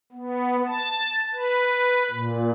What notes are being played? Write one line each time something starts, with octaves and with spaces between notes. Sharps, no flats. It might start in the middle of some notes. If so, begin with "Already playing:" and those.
B3
A5
B4
A#2